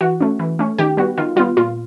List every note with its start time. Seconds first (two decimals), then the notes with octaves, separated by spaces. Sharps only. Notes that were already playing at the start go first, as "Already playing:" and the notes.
0.01 E3 F#4
0.21 A3 C#4
0.39 E3
0.59 A3 C#4
0.78 D#3 G4
0.97 G3 B3 F#4
1.18 D#3 F4
1.36 G3 B3 F4
1.57 A#2 F4